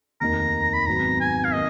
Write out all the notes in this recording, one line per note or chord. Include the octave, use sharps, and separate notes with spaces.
F1 D#2 D#3 A#3 A#5
B5
G#1 G#2 F#3 B3 D#4 A#5
G#5
F5
D#3 A#3 D#5